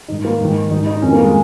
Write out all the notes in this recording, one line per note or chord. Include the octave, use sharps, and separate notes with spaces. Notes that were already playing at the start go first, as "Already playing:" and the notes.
G#2 D#3 D#4
A#3
G#2 D#3
G#2 D#3 D#4
D#4
F2 D#3 C#4
A#3
G#3